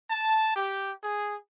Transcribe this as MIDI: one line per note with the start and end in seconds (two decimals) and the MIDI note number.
0.10 0.52 81
0.56 0.93 67
1.02 1.37 68